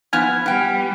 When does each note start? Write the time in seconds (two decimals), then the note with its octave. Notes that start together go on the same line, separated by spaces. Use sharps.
0.13 F3 B3 E4 G#5 F6 G#6
0.46 G3 B3 G5